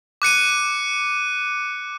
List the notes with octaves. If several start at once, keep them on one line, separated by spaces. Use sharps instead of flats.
D6 F#6 C#7 D#7